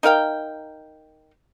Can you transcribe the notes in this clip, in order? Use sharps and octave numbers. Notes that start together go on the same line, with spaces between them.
D#4 A#4 F5 G5